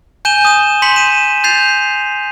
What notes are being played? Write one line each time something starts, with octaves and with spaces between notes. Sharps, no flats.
G#5 G6 D#7 E7 G7
D#6 E7
C6 G6 B6 C#7 F#7
D#7 E7
G6 A6 C7 F7